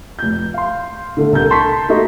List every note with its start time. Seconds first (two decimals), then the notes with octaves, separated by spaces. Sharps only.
0.19 F1 G6
0.54 F5 C6
1.17 D3 A3
1.32 C2 A4 A#4 G6
1.50 A5 C6 C#6 B6
1.89 A3 A#3 D#4 F#4 D#5